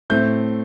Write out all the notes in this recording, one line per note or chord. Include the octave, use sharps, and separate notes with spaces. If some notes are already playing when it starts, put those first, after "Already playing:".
A2 A3 C4 G6